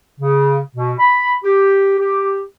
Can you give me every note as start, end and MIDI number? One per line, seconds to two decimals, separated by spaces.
0.20 0.59 49
0.76 0.92 47
0.99 1.33 83
1.43 1.94 67
1.99 2.42 67